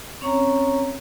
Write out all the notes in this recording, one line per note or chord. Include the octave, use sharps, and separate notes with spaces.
C4 C#4 C#5 A#5